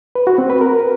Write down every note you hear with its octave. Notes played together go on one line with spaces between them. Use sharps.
B4
F#4
C4
B4
A#4